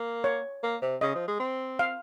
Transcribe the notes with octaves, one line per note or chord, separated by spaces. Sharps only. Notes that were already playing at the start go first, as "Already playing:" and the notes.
Already playing: A#3
C#5
A#3
C3
C#3 D#5
F3
G#3
C4
F5